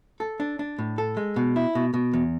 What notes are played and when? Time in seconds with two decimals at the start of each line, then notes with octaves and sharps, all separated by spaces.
0.20 A4
0.40 D4
0.59 D4
0.79 A2
0.98 A4
1.17 G#3
1.36 B2
1.56 E4
1.75 B2
1.94 B2
2.13 E2